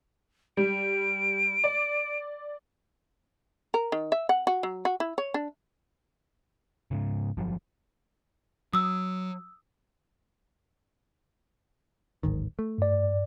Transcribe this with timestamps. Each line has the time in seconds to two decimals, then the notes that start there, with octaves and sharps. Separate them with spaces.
0.57 G3 D7
1.64 D5
3.74 A#4
3.92 D#3
4.12 E5
4.29 F#5
4.47 F#4
4.63 F#3
4.85 F#4
5.00 E4
5.18 C#5
5.34 D4
6.91 G#2 C#3
7.37 G1 G2 F3 F#3
8.74 F#3 D#6 E6
12.23 D1 G#1 D#3
12.59 A3
12.78 G2 D5